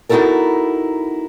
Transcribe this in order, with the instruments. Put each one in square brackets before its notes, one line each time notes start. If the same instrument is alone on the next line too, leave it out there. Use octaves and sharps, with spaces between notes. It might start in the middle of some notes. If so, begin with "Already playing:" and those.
[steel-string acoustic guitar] B3 D#4 E4 F#4 A4 A#4